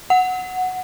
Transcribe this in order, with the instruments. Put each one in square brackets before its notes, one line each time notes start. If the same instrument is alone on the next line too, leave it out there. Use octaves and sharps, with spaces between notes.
[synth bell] F#5